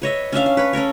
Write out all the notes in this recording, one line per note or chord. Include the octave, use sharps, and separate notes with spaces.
B4 C#5 D#5 E5
C#4 D4 E5 F5
F5
B4 C#5 B5
C#4 A4 A#4 C#5